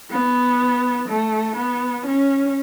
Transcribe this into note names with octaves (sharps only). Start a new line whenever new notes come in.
B3
A3
B3
C#4